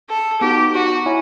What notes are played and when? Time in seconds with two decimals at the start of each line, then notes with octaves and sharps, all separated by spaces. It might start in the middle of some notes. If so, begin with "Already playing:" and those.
0.09 A4
0.41 B3 D#4 F#4 G4
0.74 F#4
1.06 E4 C#5 E5 G#5